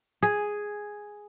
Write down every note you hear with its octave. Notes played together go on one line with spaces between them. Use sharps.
G#4